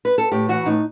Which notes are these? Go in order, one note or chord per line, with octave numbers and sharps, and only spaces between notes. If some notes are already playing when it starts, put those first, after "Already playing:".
B4
A4
A2 G4
E3 F#4
A2 D#4